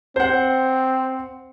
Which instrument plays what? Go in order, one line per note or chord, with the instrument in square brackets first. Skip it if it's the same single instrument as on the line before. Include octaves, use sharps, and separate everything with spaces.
[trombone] C4 [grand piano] C5 F#5